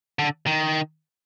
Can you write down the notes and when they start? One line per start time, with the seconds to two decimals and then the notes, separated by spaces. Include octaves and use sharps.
0.19 D3
0.47 D#3